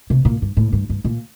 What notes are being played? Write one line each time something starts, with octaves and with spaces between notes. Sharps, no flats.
C3
A#2
G2
A2
G2
G2
A#2